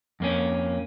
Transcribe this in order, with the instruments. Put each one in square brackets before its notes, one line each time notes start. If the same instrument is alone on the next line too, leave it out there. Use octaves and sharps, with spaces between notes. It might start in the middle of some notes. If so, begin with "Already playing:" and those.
[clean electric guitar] F2 A#3 C#4